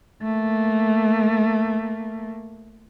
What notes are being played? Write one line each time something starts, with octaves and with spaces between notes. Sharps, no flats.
A3 A#3